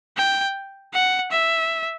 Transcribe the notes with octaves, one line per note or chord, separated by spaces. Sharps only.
G5
F#5
E5